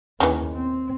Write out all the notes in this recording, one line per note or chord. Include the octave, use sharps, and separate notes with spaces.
D#2 C#3 E3
C4